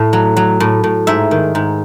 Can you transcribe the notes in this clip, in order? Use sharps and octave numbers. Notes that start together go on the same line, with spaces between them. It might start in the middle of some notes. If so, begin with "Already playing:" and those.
Already playing: A2
F#3
F#3
A2
A2
G#2 E5
D#3
G#2